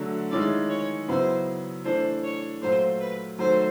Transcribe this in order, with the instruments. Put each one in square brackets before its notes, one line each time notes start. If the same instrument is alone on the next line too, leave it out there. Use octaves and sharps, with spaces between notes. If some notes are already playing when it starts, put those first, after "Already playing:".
Already playing: [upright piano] D3 F#3 A3 D4
[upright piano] D#3 G#3 C#4 E4 [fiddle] D5
[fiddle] C#5
[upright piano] C#3 F#3 B3 E4 [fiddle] C5
[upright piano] E3 A3 D4 [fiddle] C5
[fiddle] C#5
[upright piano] A#2 F#3 A3 [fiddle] C5
[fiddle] B4
[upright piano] D#3 F#3 A3 [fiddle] C5